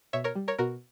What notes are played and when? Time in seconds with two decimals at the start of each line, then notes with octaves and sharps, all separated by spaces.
0.13 B2 C#5 E5
0.24 A#4 C#5
0.35 G3
0.48 A#4 C#5
0.59 B2 F#4 A#4